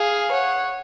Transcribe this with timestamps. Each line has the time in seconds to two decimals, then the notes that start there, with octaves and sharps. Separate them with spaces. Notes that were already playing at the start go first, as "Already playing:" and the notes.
Already playing: G#4 F5
0.32 C#5 F#5